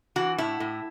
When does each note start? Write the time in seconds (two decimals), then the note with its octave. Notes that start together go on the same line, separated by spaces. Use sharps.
0.16 E3 F#4
0.38 A2 E4
0.60 A2